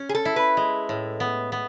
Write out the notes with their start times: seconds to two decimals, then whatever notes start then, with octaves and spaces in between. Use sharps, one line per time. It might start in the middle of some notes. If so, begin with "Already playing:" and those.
Already playing: C#4
0.09 G#4
0.15 A4
0.25 E4
0.36 B4
0.57 G#3
0.89 A2
1.20 B3
1.52 B3